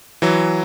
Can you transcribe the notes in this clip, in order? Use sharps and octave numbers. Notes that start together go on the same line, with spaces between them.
E3 F#3